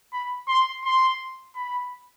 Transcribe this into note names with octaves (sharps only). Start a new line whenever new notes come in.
B5
C6
C6
B5